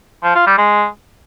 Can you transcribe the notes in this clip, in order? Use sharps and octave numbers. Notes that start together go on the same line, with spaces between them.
F3
F4
G3
G#3